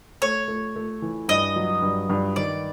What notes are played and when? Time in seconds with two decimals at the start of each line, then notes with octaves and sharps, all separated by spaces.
0.22 A3 C#5
0.48 A3
0.76 A3
1.02 E3
1.29 G2 D#5
1.56 F#3
1.82 G2
2.10 G2
2.36 D#3 D5